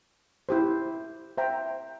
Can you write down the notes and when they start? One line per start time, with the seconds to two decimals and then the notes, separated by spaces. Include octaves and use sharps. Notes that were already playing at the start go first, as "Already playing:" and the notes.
0.49 E4 G4 C5
1.37 C5 E5 G5 A#5